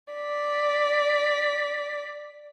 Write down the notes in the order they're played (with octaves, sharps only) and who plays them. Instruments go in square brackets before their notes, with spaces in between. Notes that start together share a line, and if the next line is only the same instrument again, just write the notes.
[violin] D5 B6